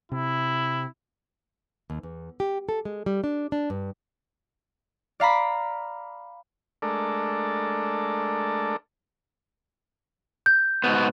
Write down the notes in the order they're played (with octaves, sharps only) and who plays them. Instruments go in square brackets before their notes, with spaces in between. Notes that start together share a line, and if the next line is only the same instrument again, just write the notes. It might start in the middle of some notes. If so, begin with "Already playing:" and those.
[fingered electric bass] C3 [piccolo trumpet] E4
[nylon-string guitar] D#2
E2
G4
A4
G#3
G3
D4
D4
G2
[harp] D5 F5 A#5 B5
[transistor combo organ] G#3 A3 D4 A4 A#4 D5
[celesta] G6
[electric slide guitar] G#2 B2 B3